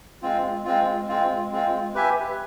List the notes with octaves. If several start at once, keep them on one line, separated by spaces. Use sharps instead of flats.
G#3 C4 F4
G#3 C4 F4
G#3 C4 F4
G#3 C4 F4
G4 B4 E5 G#5